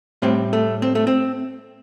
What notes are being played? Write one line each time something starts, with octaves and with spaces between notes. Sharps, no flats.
A2 G3 C4
A3
C4
A3
C4